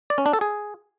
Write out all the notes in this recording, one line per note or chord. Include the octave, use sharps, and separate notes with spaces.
D5
C#4
D4
A4
G#4